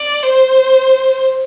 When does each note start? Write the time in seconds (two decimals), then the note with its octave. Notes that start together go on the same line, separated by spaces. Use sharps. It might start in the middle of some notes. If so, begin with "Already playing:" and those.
Already playing: D5
0.23 C5